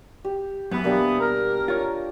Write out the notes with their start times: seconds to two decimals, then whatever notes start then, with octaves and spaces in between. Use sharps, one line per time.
0.25 G4
0.71 F#2 E3 B3
0.84 B2 G3 A#3 D4 G4
1.20 A#4
1.68 F4 C#5